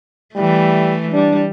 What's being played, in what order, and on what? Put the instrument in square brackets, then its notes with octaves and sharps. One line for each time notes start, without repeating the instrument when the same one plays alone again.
[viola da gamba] E3 A3 [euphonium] G3
[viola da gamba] G3 [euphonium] D4